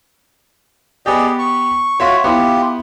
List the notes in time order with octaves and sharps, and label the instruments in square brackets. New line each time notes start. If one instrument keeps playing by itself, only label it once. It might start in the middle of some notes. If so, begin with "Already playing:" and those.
[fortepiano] B3 G4 [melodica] G#4 D5 D#5
[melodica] C#6
[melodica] F4 F#4 [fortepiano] C#5 E5
[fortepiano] B3 E4 [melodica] F4 G4